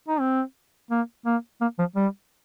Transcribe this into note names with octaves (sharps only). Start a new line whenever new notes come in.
D#4
C4
A#3
A#3
A#3
F3
G3